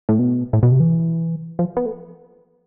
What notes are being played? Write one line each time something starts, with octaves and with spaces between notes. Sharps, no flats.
A2
B2
A2
B2
C3
E3
F3
B3
A3